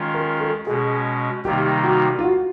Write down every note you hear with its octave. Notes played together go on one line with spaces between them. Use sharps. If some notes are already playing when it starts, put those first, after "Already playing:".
Already playing: D#3 G#3 C#4 F4
A#4
A4
B2 G#3 C#4 G#4
C3 D#3 G3 A#3 D#4 G4
F#4
F4
F#4